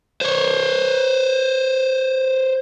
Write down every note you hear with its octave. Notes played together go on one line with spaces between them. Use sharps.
C5 C#5